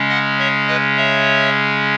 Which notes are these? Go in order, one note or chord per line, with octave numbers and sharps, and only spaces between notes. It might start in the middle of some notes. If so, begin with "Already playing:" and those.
Already playing: C#3 G#3 C#4
D#5 F#5
C#5 E5
B4 D#5
C#5 E5